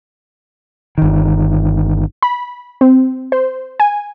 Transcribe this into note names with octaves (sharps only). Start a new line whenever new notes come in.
G1 D#3
B5
C4
C5
G#5